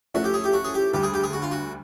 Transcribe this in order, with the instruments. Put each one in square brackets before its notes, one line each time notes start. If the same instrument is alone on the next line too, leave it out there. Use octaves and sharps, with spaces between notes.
[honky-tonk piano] F3 A3 C#4 E4 A4 [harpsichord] F#4
[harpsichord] G4
G#4
G4
F#4
G#4
G4
[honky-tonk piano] D2 D3 G3 [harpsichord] G4
[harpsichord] G#4
G4
G#4
F#4
F4
F#4